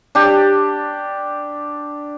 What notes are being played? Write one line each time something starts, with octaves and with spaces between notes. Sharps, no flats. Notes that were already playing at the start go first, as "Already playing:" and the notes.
D4 G4